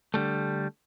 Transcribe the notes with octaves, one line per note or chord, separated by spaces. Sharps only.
D3 G3 A3